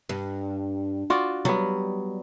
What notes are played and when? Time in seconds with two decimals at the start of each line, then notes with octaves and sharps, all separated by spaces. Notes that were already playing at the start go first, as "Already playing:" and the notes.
0.09 G2
1.10 F4 F#4 D5
1.45 F#3 G3 B3